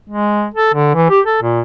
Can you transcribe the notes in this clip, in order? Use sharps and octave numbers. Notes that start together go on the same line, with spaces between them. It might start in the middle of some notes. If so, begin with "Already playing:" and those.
G#3
A4
D3
E3
G4
A4
A#2